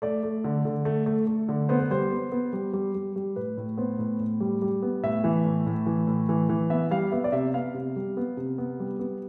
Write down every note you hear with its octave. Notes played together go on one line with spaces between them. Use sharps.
A3 D5
A3
D3
D3
A3
A3
A3
D3
B3 C5
B4
G3 C5
B3
B3
G3
G3
G3
G3
A2 B4
A2
B3 C5
A2
A2
G3
G3
B3
A2 E5
E3
A2
A2
E3
A2
E3
E3
B3 E5
G3 F5
B3 E5
D5
C3 E5
B3 F5
C3
G3
B3
C3
B3
G3
B3